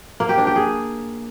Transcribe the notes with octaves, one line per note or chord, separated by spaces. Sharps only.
A#3
G4
D4
G4
G#4